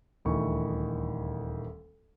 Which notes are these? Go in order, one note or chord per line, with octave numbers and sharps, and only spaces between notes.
D#1 D2 D#3 E3 C#6